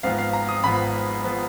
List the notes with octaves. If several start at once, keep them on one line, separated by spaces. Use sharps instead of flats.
G#1 G#2 F3 B3 F5
F5
A#5
D#6
G#1 G#2 F3 B3 B5
F3 B3